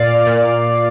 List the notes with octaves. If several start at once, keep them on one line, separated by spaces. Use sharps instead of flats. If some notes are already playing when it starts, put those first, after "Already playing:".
Already playing: A#2 D5 F5
A#2